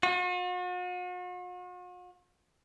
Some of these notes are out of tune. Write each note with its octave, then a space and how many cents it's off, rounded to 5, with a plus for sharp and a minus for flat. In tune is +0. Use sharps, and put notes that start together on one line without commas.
F#4 -45